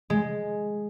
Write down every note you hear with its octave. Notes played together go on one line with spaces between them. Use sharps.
G#3